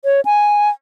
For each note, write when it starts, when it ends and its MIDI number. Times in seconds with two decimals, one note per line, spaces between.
0.05 0.21 73
0.25 0.69 80